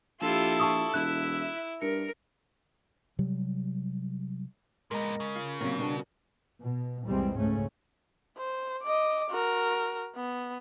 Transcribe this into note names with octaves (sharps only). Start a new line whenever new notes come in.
A#1 E4 F4 G4 A4
A5 C#6 D#6
E1 E4 E5 F#6
G2 A#4 C#7
C3 F#3 G3
A#2 G#3 B3 A#4 A#5
C#3
F4
C3 E3 F#3 A#3 C#4 A#4
B2 G3 D4 F#4
B2
F1 C2 E3 G3 G#3 C4
C#2 G#2 C#3 A3 C#4
C5
D#5 D6
F#4 A#4
B3